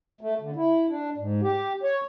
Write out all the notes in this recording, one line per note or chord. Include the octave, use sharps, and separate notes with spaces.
A3
D3
E4
D4
G#2
G4
C#5